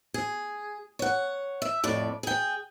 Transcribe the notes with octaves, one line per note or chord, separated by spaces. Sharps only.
G#4
C#5 F#5
E5
F2 A2 D5
G#4 G5